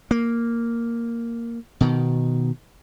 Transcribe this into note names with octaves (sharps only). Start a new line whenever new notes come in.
A#3
B2 D#3